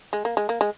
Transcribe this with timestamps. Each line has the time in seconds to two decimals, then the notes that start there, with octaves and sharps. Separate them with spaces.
0.13 G#3
0.25 A#3
0.37 G#3
0.49 A#3
0.61 G#3